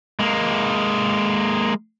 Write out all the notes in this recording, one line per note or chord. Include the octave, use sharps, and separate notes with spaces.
G#3 A#3